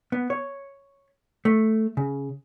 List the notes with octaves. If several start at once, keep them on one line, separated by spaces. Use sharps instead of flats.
B3
C#5
A3
C#3